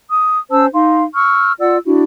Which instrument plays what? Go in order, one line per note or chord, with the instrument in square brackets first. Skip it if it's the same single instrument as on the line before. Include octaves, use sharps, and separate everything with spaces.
[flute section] D#6
C#4 C5 A5 E6
D#4 F5 C6
C#6 E6 F6
F4 D5 F#5 E6
D4 E4 F#4